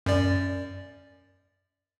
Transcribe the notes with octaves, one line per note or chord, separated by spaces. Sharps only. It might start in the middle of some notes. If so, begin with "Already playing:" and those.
F#2 D5